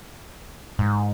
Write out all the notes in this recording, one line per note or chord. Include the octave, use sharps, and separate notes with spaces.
G#2